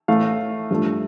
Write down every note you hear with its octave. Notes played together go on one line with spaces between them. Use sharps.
A2 E3 A3 F5
G2 F3 A3